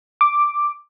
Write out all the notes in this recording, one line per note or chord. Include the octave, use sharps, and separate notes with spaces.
D6